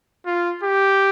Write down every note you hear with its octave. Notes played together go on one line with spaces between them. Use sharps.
F4
G4